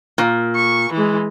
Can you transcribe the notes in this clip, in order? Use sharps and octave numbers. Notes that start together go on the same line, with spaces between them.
A#2
C#6
E3 G#3